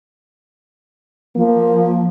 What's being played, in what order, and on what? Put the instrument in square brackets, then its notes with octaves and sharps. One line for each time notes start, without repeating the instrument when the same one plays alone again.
[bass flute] F3 [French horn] A#3